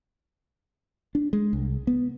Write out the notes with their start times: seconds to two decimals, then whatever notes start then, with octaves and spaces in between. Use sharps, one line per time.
1.15 D4
1.33 G#3
1.53 C2
1.87 B3